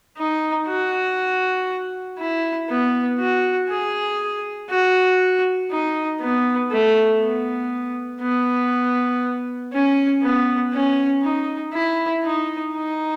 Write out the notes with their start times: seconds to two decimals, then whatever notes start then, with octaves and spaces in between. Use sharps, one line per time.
0.17 D#4
0.68 F#4
2.19 E4
2.69 B3
3.19 F#4
3.69 G#4
4.70 F#4
5.71 D#4
6.21 B3
6.71 A3
7.22 B3
8.21 B3
9.73 C#4
10.22 B3
10.73 C#4
11.23 D#4
11.73 E4
12.24 D#4
12.74 D#4